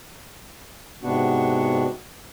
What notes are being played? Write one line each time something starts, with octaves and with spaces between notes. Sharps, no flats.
G#2 C3 B3 D4 F#4